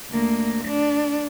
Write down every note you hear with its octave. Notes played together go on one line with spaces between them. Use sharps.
D2 A#3
D4